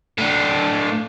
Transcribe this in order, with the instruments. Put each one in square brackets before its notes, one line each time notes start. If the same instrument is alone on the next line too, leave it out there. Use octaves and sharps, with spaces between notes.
[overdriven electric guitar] A2 D4